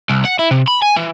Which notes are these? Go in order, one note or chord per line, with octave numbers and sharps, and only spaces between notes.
C2
F#5
E4
C3
B5
G#5
E3